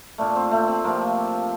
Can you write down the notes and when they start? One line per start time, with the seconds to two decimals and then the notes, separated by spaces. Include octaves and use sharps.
0.18 A#2 A3 D4
0.36 C4
0.51 A3
0.68 C4
0.84 C3 F3 A3 A#3